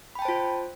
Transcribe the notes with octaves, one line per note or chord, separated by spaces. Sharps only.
F4 C5 G5 A5 B5